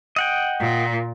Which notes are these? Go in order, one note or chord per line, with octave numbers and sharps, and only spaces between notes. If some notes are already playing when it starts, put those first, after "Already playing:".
D#5 F#5 G5
A#2